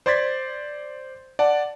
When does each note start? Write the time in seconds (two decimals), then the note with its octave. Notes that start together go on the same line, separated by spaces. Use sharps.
0.06 C5 D5 C6 G#6 A6 B6
1.39 D5 F#5 A5